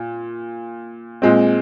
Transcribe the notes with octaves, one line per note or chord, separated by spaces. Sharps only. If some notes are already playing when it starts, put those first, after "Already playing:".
Already playing: A#2
A#2 G#3 C4